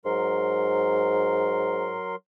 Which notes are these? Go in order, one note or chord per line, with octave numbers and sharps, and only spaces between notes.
G#2 F#3 A#4 C6